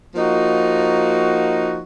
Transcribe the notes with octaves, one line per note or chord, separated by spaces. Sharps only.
F3 A#3 D#4 F#4